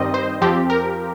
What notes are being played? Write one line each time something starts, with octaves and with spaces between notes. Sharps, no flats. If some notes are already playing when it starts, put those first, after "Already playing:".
Already playing: G2 D#3 G3 C4 D#5
C5
F2 F3 C4 G4
A#4